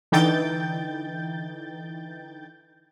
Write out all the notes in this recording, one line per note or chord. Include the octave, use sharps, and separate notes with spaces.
D3 E3 D#4 G5 G6 A6